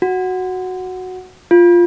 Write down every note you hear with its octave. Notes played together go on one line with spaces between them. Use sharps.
F#4
F4